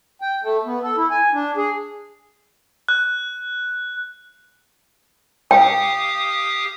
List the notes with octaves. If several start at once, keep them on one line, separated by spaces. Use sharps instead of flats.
G5
A3
B3
A4
E4
G#5
D4
G#4
F#6
G4 F5 G5 D#6